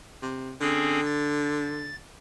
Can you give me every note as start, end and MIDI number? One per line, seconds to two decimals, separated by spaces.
0.22 0.52 48
0.61 1.94 50
0.61 1.00 60
0.61 1.00 61
0.61 1.00 68
1.06 1.96 93